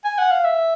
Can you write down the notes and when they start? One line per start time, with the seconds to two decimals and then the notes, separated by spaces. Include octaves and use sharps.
0.05 G#5
0.18 F#5
0.32 F5
0.44 E5